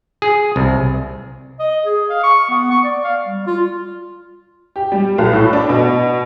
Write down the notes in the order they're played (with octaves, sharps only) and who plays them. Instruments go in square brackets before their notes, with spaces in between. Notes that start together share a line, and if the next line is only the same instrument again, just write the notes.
[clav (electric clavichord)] G#4
C2
[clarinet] D#5
G#4
F5
C#6
B3
C#6
D5
F5
G3
F4
[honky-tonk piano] G4
G3
B1
A2
D4
B2